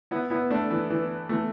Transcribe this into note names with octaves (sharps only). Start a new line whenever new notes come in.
B3 E4
B3 E4
A3 D4
E3
E3
E3 A3